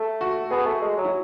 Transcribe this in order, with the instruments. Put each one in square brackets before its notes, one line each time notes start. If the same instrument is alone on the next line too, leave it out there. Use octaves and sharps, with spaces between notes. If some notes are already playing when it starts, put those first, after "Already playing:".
Already playing: [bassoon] A3
[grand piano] F#4
[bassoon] B3 [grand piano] G#4
[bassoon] A3
G#3
F#3
[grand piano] E4